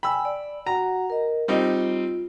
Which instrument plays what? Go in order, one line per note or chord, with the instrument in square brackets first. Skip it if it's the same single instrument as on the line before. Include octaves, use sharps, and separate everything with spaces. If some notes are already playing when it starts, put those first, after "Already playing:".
[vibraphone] G5 G#5 [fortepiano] B5 E6
[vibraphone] D5
[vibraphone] F#4 F#5 [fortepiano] A#5
[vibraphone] A#4 D#5
[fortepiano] G3 C4 D#4 [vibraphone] F4